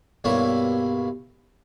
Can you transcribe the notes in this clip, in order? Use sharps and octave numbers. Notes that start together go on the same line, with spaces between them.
B1 G2 A#3 E4 C#5